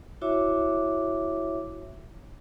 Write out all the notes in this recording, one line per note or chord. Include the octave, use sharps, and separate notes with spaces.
E4 F#4 C#5 E5 D6